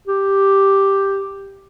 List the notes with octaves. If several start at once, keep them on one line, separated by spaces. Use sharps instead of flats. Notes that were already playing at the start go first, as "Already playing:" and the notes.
G4